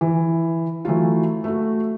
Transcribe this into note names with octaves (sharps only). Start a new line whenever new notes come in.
E3
E3 F#3 A3 F4
A3 F#4